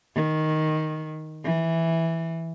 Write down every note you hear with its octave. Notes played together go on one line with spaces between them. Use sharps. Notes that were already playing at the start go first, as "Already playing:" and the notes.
D#3
E3